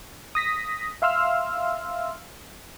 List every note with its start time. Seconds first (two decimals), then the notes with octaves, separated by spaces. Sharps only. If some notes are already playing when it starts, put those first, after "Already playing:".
0.35 D#6 A#6 B6
1.02 E5 F5 C6 E6 F6